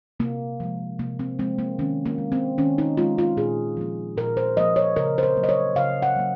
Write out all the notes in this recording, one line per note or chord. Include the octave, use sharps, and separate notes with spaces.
C3 A#3
F3 G#3
C3 A#3
C4
F3 G#3 C4
A#3
D#3 C#4
A#3
G#3
C4
D#3 C#4
D#4
G#3 F4
F4
A#2 G#4
F3 A#3
A#2 A#4
C5
F3 A#3 D#5
C#5
C#3 A#4
C5
A#4
F#3 A#3
D#5
C#5
C#3 F5
F#5
F#3 A#3